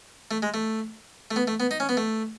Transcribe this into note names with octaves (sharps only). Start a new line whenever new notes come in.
A3
G#3
A3
A3
B3
A3
B3
D#4
C#4
B3
A3